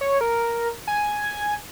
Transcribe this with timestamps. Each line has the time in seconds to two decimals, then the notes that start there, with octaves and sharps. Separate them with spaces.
0.01 C#5
0.21 A#4
0.87 G#5